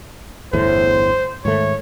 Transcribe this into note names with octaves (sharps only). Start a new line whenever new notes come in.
G1 E2 A2 C5
G#2 D#3 A3 C#5